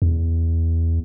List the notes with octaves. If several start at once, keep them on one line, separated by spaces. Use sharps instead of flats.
E2